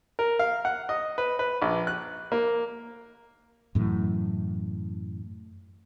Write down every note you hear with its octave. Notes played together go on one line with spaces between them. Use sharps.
A#4
F5
F#5
D#5
B4
B4
A#1
F#6
A#3
F#2 A2 E3